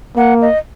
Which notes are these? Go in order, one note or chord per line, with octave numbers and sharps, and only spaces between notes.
A#3 F#5
D#5